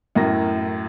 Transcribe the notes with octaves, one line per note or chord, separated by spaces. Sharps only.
F#2 A2 A#4 A#6